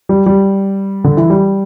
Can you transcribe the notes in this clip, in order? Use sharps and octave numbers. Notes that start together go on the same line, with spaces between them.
G3
G3
D3
E3
G3